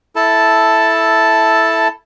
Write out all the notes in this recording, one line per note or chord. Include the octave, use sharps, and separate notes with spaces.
E4 A4 A5